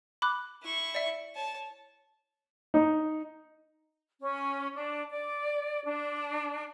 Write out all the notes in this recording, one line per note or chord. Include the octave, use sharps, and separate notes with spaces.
B5 D6 F#6
E4 C#6
D5 E5
C#5 A5
D#4
C#4
D4
D5
D4